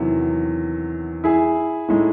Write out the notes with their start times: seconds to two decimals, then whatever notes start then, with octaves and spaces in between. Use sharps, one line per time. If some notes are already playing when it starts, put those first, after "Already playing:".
Already playing: E2 C3 D#3 F#3
1.24 E4 G#4
1.88 A2 G#3 D#4